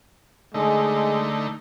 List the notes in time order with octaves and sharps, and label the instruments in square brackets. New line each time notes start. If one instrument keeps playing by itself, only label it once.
[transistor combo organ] D3 A3 D#4 [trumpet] G#3